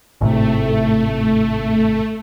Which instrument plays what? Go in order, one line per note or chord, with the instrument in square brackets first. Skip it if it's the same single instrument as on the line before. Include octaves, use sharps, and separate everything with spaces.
[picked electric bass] G#1 A2 C3 [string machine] A3